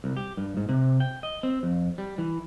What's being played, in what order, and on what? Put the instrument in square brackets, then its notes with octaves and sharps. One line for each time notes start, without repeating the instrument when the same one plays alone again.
[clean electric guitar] C2
G4
G2
G#2
C3
G5
D#5
C4
F2
G3
E3